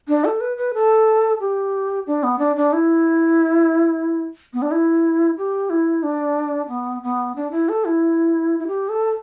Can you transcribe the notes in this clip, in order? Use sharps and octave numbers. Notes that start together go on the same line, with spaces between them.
D4
A4
B4
B4
A4
G4
D4
B3
D4
D4
E4
B3
D4
E4
G4
E4
D4
B3
B3
D4
E4
A4
E4
E4
G4
A4